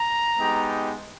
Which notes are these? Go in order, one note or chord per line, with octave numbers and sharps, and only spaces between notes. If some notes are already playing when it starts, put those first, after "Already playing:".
Already playing: A#5
G#3 B3 D#4 G4